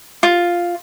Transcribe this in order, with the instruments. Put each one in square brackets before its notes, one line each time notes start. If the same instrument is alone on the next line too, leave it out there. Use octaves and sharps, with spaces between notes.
[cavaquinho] F4